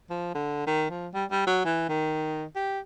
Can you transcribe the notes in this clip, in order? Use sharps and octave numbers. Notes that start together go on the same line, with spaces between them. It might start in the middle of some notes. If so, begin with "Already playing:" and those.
F3
D3
D#3
F3
G3
G3
F#3
E3
D#3
G4